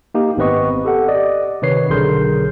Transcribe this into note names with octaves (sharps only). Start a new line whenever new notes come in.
A#3 D#4 G4
G#1 B3 C4 B4 D#5 C#6
G4 A4 F#5
D5 D#5
C3 D#3 B4 C#5 C7
B1 D3 G#4 A#4 C6 G6